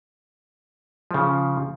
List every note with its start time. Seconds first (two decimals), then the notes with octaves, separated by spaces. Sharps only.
1.11 C#3 F3